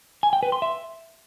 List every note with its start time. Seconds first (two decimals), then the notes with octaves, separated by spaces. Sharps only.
0.23 G#5
0.33 G5
0.43 B4
0.52 C6
0.62 E5